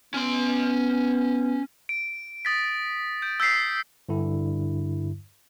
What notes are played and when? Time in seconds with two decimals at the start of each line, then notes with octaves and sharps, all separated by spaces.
0.14 B3 C#4 C6
1.89 D7
2.45 D#6 A6 B6
3.22 G6 D7
3.40 E6 G6 A6 B6 C7
4.09 G2 D3 E4